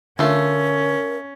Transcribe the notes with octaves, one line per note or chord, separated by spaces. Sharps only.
D3 A3 C#4 F4 A#4